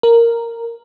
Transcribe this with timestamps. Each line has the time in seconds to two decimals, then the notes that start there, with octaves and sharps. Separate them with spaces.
0.03 A#4